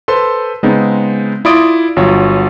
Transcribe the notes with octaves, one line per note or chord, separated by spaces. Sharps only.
A4 B4 C5 C6
C#3 G#3 B3 C4 D#4
E4 F4 D5 C6 D#6 D7
G1 F#3 F4 C#5